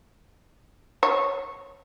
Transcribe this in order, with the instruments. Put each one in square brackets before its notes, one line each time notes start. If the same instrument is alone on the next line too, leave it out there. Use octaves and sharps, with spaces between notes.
[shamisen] C#5